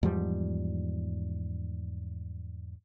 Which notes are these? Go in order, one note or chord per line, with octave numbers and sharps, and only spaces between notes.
E2 G#2 F3 G3